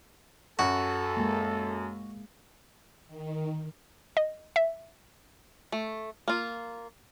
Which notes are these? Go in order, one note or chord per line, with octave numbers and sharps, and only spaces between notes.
F#2 F#4 A4
G#3 A#3
D#3
D#5
E5
A3
A#3 F4